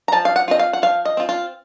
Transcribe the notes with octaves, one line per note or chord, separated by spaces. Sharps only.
A#5
F3 A5
F5
F#5
C4 F4 D#5
F5
F#5
F3 F5
D#5
C4 F4
F4